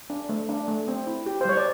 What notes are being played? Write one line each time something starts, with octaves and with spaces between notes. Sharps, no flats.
D4
A3
D4
A3
C4
E4
G4
C5
G3 C#5
D5